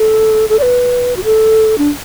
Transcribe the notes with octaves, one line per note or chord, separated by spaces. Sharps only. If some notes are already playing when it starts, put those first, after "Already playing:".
Already playing: A4
A4
D5
B4
F#4
A4
D4